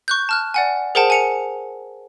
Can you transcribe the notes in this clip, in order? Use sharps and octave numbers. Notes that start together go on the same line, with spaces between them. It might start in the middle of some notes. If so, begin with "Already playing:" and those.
C#6 F#6 G6
A5 F6 F#6
D5 F#5 G#5
G#4 A#4 C5 F#5 G5 A5
G#5 C#7 F7